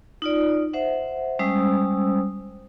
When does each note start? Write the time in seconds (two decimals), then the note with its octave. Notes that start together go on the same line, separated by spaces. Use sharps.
0.22 D#4 F4 D5
0.73 C5 E5 F#5
1.39 G3 G#3 C#4 C5 D#6 E6